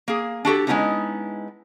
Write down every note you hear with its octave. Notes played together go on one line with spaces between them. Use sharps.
A#3 G#4
D4 F#4 G4 A4
G#3 A#3 B3 C#4 D#4 E4